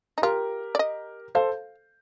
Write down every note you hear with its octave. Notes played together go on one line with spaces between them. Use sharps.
D#4
F4 G4 A#4
D5
D#5
A4 C5 F5